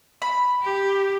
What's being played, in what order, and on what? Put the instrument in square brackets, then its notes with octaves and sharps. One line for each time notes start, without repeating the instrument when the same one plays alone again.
[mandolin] B5
[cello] G4